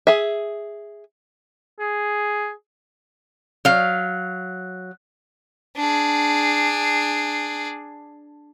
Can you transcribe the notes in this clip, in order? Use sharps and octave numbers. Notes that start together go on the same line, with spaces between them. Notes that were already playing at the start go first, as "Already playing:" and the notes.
G#4 E5
G#4
F#3 F5
D4 G#4